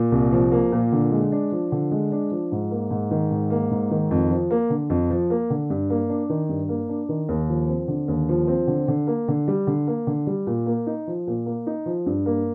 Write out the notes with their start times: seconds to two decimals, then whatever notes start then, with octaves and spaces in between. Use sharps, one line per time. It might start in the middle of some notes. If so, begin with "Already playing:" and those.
Already playing: A#2
0.12 C2
0.32 F3
0.52 A#3
0.72 A#2
0.92 D3
1.11 G#3
1.32 D4
1.52 F3
1.72 D3
1.91 G#3
2.12 D4
2.31 F3
2.52 G#2
2.71 A#3
2.91 G#2
3.11 D#3
3.31 G#2
3.50 A#3
3.71 G#2
3.91 D#3
4.11 F2
4.31 F3
4.51 A#3
4.70 D3
4.90 F2
5.10 F3
5.30 A#3
5.50 D3
5.70 G2
5.90 A#3
6.10 D4
6.29 D#3
6.49 G2
6.69 A#3
6.89 D4
7.09 D#3
7.29 D#2
7.49 F3
7.68 C4
7.88 D3
8.08 D#2
8.29 F3
8.48 C4
8.67 D3
8.88 D3
9.07 A#3
9.28 D3
9.48 G3
9.67 D3
9.87 A#3
10.07 D3
10.27 G3
10.47 A#2
10.66 A#3
10.87 D#4
11.07 F3
11.27 A#2
11.46 A#3
11.67 D#4
11.86 F3
12.06 G2
12.26 A#3